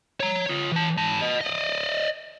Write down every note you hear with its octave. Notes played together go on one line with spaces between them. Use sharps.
C#5 A#5
F4 C#5
E3 A5
G#2 A5
B4 D#5
D5 D#5